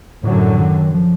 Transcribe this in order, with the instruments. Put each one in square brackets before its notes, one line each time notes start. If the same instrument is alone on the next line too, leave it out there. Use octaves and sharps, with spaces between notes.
[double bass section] F#2 D3 F#3 [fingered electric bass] A2
[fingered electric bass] E3
D#3
F3